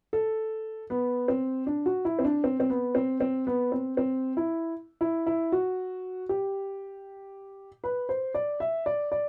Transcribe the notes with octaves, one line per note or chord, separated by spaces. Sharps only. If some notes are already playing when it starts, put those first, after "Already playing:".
A4
B3
C4
D4
F#4
E4
C4
D4
C4
C4
B3
C4
C4
B3
C4
C4
E4
E4
E4
F#4
G4
B4
C5
D5
E5
D5
D5